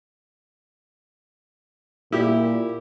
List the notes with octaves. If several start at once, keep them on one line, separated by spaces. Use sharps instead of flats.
A#2 E4 G4